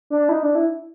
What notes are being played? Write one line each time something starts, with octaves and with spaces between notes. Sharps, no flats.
D4
E4
D#4
D4
E4